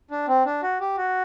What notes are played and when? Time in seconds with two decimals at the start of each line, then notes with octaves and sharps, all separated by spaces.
0.11 D4
0.28 C4
0.46 D4
0.63 F#4
0.80 G4
0.97 F#4